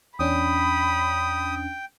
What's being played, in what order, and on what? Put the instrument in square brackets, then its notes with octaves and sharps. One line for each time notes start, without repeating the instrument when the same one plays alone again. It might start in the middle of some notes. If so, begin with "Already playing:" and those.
[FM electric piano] E2 C#4 D4 [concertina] G5 [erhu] B5 [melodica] D#6